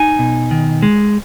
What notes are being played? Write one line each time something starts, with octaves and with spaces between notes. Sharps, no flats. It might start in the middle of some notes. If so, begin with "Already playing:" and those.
Already playing: D#4 G#5
B2
D#3
G#3